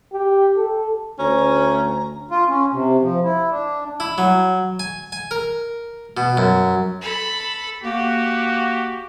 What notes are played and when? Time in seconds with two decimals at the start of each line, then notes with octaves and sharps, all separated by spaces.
0.13 G4
0.57 A4
1.19 D2 C#4 A#5
2.31 F4
2.48 C#4
2.73 C3
3.02 F3
3.24 E4
3.51 D4
4.00 E4
4.18 F#3
4.79 G#5
5.12 G#5
5.31 A#4
6.17 B2
6.37 F#2
7.02 A4 B5
7.84 A#3 F#4 G4